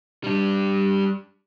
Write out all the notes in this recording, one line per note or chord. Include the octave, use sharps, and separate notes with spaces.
G3 D4